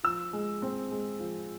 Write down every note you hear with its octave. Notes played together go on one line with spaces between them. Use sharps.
F3 E6
G#3
C4
G#3
F3